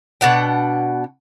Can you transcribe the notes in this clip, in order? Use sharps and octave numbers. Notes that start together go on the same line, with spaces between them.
B2 D4 F#5 G5